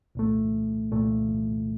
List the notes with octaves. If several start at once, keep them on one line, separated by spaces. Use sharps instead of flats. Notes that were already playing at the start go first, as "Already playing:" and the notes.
C2 A#2 A3
C2 A#2 A3